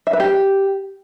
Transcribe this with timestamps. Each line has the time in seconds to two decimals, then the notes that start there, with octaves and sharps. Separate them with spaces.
0.07 E5
0.13 B4
0.20 G4